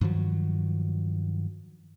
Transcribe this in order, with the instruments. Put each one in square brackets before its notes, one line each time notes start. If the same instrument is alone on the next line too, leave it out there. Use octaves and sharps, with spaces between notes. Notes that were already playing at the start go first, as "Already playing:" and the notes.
[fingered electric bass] G2 D#3 F3 F#3